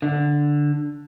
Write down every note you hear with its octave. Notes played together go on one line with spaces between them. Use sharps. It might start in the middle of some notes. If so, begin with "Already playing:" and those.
D3